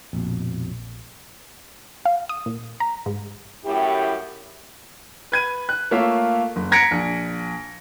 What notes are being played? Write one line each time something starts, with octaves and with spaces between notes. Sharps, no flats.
A#1 F2 B2
F5
D#6
A#2
A#5
G#2
F#2 A2 E4 G4
B4 G#6 D#7
F#6
A3 A#3 F4 C#5 E5 F5
F#1
A#5 G#6 A#6 B6 C#7 D7
A#1